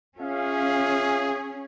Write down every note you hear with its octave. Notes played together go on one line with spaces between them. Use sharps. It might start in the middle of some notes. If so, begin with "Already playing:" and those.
C#4 F4 G#4 E5 F5